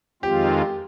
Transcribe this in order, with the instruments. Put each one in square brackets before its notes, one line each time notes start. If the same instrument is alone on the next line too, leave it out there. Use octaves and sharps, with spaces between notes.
[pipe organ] F2 D#3 G#3 C4 F4 [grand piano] G4